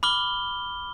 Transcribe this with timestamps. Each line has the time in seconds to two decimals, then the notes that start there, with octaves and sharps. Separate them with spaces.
0.03 B5 D6 F6 G7